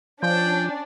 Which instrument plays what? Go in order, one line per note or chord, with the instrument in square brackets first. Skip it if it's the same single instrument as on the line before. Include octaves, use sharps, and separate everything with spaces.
[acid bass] F3 [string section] C#4 D4 [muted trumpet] G5